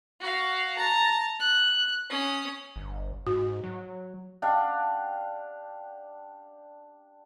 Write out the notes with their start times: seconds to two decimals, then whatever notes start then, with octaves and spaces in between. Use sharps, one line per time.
0.20 F#4 F5
0.77 A5 A#5
1.39 F#6
2.10 C#4 D#6
2.76 G1
3.27 G#2 F#4
3.64 F#3
4.42 D4 G4 F5 F#5